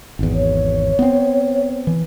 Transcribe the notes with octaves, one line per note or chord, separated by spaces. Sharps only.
G#1 E2
C#5
B3 C4
E3